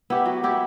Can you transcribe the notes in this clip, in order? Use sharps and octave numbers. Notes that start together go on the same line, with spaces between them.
B3 E4 G4
F#3
B3 E4 G4